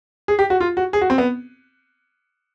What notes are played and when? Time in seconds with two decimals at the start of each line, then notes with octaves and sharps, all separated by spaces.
0.28 G#4
0.39 G4
0.50 F#4
0.60 F4
0.77 F#4
0.93 G#4
1.01 F#4
1.10 C4
1.18 B3